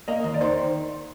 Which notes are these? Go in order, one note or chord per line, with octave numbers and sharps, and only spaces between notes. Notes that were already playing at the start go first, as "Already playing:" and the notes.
A#3 D#5
D#2
D5
D#3 C5